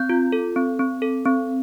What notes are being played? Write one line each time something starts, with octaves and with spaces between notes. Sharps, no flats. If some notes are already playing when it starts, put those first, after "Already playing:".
Already playing: C4 G6
F4
A4
C4
C4
A4
C4